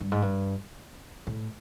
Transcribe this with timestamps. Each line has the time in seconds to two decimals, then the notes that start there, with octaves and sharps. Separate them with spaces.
0.01 G2
0.12 G#2
0.22 G2
1.27 A2